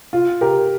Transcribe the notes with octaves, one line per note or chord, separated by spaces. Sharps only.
F4
G4 A#4